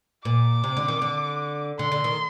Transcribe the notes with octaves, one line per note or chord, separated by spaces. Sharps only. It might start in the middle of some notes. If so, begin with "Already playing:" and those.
A#2 D6
C3
D3
D#3
D3
D3 C6
D3
D#3